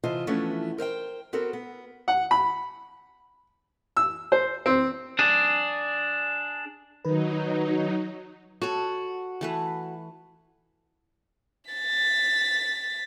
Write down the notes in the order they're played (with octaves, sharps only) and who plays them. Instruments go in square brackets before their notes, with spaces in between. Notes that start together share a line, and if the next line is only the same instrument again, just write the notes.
[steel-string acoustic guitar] C3 E3 F4 C5 D#5 A5
E3 F3 A3 B3 C#4 D4
A#4 C5 E5 G5
B3 C4 F#4 A4 A#4
B3
[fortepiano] F#5
B5
E6
C5
C4
[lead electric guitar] D4 G#4
[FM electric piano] D#3 B4 [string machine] F#3 D#4
[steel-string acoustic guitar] F#4 [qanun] A4 C#5
[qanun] E3 A3 B4
[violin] A6 B6